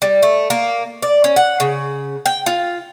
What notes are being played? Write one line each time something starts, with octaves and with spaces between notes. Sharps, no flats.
G3
A3
A#3
D5
C#4
F#5
C#3
G5
F4